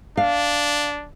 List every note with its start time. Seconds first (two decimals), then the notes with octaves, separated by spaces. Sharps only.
0.17 D4 F5